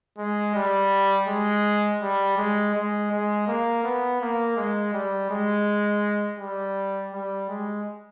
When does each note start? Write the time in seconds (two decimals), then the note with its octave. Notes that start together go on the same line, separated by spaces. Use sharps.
0.18 G#3
0.55 G3
1.28 G#3
2.02 G3
2.37 G#3
2.75 G#3
3.12 G#3
3.47 A#3
3.84 B3
4.21 A#3
4.57 G#3
4.94 G3
5.30 G#3
6.39 G3
7.13 G3
7.49 G#3